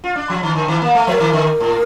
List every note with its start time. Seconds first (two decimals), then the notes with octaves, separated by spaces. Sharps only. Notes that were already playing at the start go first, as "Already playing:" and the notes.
0.04 F4
0.16 D4
0.30 F3
0.43 D#3
0.56 D3
0.68 D#3
0.82 A#3
0.95 A3
1.07 F3 C5
1.12 A#4
1.20 D#3
1.33 D3
1.60 A2